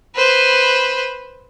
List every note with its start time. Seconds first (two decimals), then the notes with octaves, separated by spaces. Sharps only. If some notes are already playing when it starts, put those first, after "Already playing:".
0.16 B4 C5